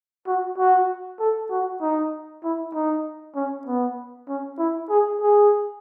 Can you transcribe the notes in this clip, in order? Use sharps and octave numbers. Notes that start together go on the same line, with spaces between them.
F#4
F#4
A4
F#4
D#4
E4
D#4
C#4
B3
C#4
E4
G#4
G#4